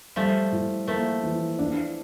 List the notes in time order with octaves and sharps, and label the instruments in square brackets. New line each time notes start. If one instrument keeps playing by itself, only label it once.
[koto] F3 A3 [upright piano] G3
[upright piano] A2
[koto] F3 A3 [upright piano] A#3
[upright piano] E3
D4